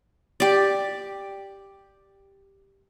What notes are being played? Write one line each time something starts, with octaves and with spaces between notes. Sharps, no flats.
G4 D5